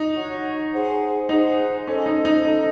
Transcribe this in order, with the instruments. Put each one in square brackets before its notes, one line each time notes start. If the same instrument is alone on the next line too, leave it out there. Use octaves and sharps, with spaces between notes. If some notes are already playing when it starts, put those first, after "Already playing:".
Already playing: [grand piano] D#4
[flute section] F#4 C#5 F#5 C#6
G#4 C5 F#5
[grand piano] D#4 [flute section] G#4 C5 F#5
[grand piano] C#4 [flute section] A4 C5 D#5
[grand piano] D#4
D#4
[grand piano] D#4 [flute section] A4 C5 D#5